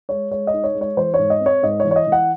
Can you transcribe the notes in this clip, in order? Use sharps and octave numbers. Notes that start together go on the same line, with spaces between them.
G#3 C#5
G#3 C#5
D#5
D#4
C#5
G#3
C#5
E3 C5
G#2 C#5
D#5
C4
C#5
G#2 D#5
C#5
E3
C#5
D#5
E3
F#5